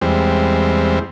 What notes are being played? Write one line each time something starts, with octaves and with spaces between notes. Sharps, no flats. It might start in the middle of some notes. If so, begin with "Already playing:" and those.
E2 G3 G#3 C4